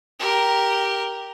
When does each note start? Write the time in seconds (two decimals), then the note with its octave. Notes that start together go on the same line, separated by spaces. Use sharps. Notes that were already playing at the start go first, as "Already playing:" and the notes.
0.19 G4 A#4